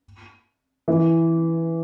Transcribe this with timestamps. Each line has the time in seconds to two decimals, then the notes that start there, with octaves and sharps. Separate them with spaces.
0.88 E3